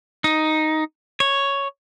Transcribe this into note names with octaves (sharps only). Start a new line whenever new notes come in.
D#4
C#5